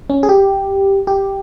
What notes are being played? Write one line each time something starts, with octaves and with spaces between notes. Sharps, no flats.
C#4
G#4
G4
G4